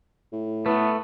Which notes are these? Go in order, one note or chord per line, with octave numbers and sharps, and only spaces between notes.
A2
A3 B3 E4 B4